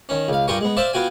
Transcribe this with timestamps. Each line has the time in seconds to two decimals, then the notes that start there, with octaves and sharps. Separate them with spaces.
0.09 D#3 C#4
0.28 C#2 F5
0.48 G2 F4 A#4 G5 G#5 C#6
0.61 G#3 B3
0.77 C5 D5 E5 F5 A5 C6
0.93 B3 F4 F#4 G5 G#5